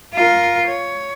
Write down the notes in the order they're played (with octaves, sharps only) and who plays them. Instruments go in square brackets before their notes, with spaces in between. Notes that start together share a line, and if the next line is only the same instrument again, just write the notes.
[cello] F4 A#4
C#5